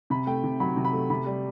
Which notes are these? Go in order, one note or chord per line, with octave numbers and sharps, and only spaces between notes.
C3 B5
A3 G5
C3
F#3 B5
C3
B5
A3
C3 B5
G3